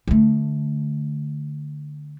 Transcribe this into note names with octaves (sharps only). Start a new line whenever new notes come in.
D3 A3